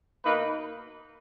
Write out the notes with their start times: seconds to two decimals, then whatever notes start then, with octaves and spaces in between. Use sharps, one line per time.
0.23 B2 A#3 D#4 B4